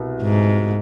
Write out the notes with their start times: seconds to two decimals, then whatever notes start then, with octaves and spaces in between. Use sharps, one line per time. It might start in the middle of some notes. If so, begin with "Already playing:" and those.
Already playing: C2 B2
0.22 G#2